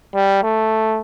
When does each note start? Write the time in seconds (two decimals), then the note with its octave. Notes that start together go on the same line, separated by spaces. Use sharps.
0.15 G3
0.43 A3